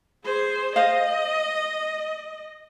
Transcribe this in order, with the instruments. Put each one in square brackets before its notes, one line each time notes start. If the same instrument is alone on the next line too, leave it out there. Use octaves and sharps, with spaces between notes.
[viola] G#4 C5
[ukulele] C5 F5 [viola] D#5